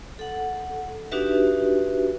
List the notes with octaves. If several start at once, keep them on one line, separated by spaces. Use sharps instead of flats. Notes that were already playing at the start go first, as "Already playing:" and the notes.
A4 F#5
D4 D#4 F#4 G4 B4 E5